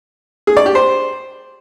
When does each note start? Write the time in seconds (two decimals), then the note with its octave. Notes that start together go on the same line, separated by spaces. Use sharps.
0.47 G#4
0.57 D5
0.66 G4
0.75 C5